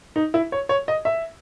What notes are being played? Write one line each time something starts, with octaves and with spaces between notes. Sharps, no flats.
D#4
E4
C#5
C#5
D#5
E5